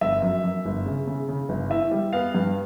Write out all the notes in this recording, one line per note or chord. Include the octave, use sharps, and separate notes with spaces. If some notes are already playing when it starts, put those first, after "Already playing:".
G1 E5
F#2
F#2
G1
C#3
C#3
C#3
G1
E3 E5
G3
B3 F5
G2